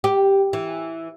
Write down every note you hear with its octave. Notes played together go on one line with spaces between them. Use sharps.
G4
E3